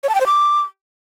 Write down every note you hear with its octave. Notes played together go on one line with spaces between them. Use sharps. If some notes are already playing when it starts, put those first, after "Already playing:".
C#5
A5
G5
C5
D6